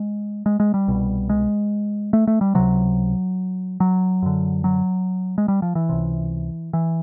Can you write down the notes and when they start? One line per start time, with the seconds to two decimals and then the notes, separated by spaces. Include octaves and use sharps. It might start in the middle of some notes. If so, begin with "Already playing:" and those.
Already playing: G#3
0.46 G#3
0.60 G#3
0.74 G3
0.88 C2 B2
1.30 G#3
2.13 A3
2.27 A3
2.41 G3
2.55 C#2 C3 F#3
3.80 F#3
4.22 F#2 D3
4.64 F#3
5.38 G#3
5.48 G3
5.62 F3
5.75 E3
5.89 C#2 C3
6.73 E3